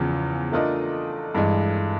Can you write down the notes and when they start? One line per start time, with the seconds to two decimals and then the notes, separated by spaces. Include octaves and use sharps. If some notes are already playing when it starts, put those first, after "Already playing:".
Already playing: E2 C#3 F3
0.52 A3 D4 F4 A#4 D#5
1.35 G2 E3 G#3